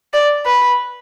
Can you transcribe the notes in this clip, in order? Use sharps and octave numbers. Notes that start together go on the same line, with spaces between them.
D5
B4